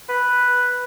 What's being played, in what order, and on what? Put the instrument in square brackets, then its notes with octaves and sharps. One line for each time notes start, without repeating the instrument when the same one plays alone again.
[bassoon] B4